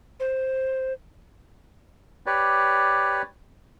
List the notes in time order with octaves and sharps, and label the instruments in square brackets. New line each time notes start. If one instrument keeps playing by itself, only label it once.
[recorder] C5
[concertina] G4 B4 C#5 D5